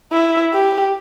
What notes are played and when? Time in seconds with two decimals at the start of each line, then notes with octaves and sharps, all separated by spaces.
0.12 E4
0.53 G4